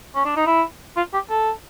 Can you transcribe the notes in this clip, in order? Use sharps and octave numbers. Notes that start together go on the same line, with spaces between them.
C#4
D4
D#4
E4
F4
G4
A4